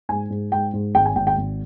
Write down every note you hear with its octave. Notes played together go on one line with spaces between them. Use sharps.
G#2 G#5
G#2
G#2 G5
G#2
G#1 G5
G#5
G#1 G5
G5
G#1